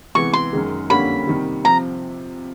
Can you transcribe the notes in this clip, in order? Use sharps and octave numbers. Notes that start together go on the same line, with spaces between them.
C3 E3 G#3 B3 C#6
C6
F#2 D#3 G#3
F2 D3 G3 A#3 C#4 B5
C3 D#3 G3
C3 F3 A#5